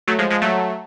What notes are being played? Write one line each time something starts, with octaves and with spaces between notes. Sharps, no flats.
F#3 A3
F3 G#3
F3 G#3
F#3 A3